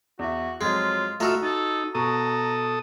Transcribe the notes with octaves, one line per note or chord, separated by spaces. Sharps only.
E2 F#4 E5
F2 F#3 G#3 F4
A3 F4 F#4 D#5 E5 A#5 E6
D#4 A4
B2 A4 A#5 C#6 D#6